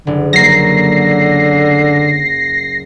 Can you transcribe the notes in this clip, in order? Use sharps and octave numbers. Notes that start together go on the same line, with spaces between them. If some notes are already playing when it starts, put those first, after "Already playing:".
F#1 D3
F#3 A#3 A#6 C7